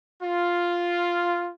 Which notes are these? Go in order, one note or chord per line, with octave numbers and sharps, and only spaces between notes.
F4